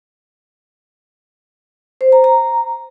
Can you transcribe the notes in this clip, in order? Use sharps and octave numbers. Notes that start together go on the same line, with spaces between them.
C5
A#5
A#5